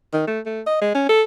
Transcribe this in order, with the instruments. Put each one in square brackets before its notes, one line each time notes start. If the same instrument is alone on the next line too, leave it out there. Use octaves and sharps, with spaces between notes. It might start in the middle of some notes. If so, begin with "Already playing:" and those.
[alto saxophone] D#3
A3
A3
D#5
G#3
C#4
A4